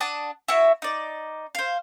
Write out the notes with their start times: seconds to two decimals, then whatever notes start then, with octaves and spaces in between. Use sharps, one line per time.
0.01 D4 F#5 A5 D#6
0.48 E4 F#4 E5
0.82 D#4 D5
1.55 C5 F5